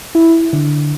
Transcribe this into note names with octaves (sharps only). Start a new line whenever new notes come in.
E4
D3